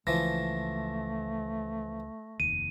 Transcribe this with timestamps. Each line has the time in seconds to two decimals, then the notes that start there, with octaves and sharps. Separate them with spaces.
0.07 C#2 E3 F3 A3 A#6
2.40 F1 D#2 D#7